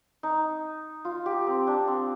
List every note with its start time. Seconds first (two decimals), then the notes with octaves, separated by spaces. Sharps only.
0.23 D#4
1.05 F4
1.26 G4
1.47 C4
1.67 D4
1.88 C4